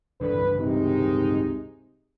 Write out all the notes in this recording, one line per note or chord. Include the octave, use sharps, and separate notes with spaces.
C#2 G2 D3 E3 B4
C3 D#3 G#3 D#4